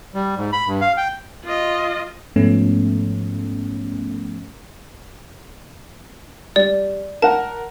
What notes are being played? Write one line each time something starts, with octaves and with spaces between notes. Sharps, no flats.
G3
G#2
B5
G2
F5
G5
F4 D#5
G#2 F3 A3 B3 C#4
G3 D5
A#4 F#5 A5